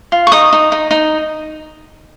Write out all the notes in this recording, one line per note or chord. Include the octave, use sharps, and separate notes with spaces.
F4
C#6
D#4 D#6
D#4
D#4
D#4